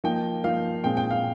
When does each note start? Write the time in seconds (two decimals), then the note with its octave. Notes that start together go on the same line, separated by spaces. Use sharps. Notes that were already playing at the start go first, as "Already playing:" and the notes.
0.04 F3 A#3 D#4 G5
0.44 F3 A#3 D#4 F5
0.83 A#2 G#3 C4 G5
0.97 G5
1.11 F5